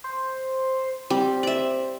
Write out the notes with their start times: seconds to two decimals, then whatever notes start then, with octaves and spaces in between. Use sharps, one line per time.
0.04 C5
1.10 G3 C4
1.43 D5 E5